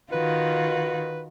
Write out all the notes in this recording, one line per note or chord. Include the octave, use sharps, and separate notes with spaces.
D#3 F4 F#4 B4